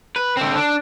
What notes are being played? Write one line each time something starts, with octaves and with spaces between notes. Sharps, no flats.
B4
D3 C4
D4